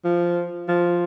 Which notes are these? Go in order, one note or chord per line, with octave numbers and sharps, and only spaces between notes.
F3
F3